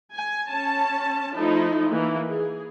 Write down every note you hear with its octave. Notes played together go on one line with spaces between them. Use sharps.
G#5
C#4 A5
F3 A3 D#4 E4
E3 A#3
G#4